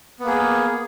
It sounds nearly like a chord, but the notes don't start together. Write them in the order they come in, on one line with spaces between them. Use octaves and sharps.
B3 A#3 G#4